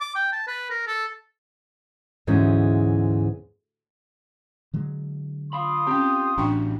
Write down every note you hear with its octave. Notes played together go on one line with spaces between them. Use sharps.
D6
G5
A5
B4
A#4
A4
D2 G#2 E3 G#3 B3 C#4
D3 F#3 G#3
F4 F5 B5 C6 D#6
C4 C#4 G4 G5
A1 E2 G3 D4 F#4 G5 C#6